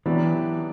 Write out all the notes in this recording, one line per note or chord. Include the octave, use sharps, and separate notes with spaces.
E3 F#3 B3 D4 G4